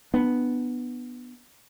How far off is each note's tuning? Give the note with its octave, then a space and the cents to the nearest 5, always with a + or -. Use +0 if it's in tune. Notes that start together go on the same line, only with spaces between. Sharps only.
B3 +0 D4 +25